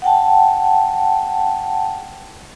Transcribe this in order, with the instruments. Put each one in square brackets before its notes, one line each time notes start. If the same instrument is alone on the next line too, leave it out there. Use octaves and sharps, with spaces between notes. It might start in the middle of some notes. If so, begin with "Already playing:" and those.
[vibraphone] F#5 G5 A5